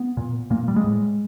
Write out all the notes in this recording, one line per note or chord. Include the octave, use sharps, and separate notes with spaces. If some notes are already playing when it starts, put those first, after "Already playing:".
Already playing: B3
A#2
A#2 A#3
G3
G#3
A2